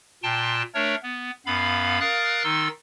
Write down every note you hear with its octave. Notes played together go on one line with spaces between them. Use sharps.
A#2 G5 A5 C6
A3 D4 A#4 C#5
B3
F#2 B3 F5 B5
A#4 F5 D#6 F6 F#6 A6
D#3 D#4 C6 E6 A6